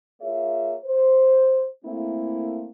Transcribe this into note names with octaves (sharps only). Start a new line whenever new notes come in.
A#3 F4 G#4 C#5 E5
C5
A3 A#3 C4 E4